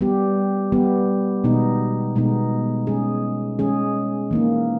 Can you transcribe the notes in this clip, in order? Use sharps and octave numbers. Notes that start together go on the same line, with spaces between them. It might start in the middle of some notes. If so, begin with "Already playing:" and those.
G3 B3 G4
G3 B3 G4
B2 G#3 B3 D#4
B2 G#3 B3 D#4
G#3 C#4 G#4
G#3 C#4 G#4
E3 A#3 D#4